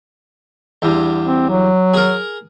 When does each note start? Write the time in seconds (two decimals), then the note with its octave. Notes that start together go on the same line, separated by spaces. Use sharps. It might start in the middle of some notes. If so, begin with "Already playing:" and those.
0.82 E2 G2
1.26 C4
1.50 F#3
1.94 G#4 A#4